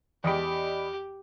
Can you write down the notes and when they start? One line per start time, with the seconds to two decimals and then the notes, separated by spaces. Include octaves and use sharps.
0.24 E2 G4 D5 D#5 G5 B5